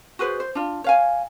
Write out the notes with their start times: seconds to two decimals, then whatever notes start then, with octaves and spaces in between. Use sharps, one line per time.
0.19 F#4 G#4 B4 C5
0.40 C5
0.55 D4 F4
0.84 C#5 F5 G#5